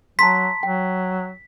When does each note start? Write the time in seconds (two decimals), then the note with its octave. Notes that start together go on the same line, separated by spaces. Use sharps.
0.19 F#3 A5 A#5 C6 B6
0.63 F#3 G5